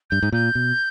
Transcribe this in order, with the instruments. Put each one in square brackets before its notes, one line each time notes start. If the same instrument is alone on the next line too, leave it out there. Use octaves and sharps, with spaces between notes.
[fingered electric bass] G2 [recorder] G6
[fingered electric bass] G#2
[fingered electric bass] A#2 [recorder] G6
[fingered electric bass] B2